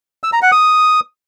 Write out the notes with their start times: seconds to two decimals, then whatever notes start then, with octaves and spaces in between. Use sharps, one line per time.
0.24 E6
0.33 A#5
0.42 F#5
0.52 D#6